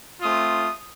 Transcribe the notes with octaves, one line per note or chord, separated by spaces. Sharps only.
A3 C4 F4 D#6